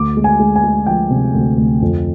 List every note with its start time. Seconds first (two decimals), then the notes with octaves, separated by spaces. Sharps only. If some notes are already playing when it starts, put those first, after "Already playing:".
Already playing: D2 D6
0.17 G#3
0.24 G#5
0.39 G#3
0.56 G#5
0.64 G#3
0.87 F3 G5
1.10 C3
1.35 D2
1.58 D2
1.82 F2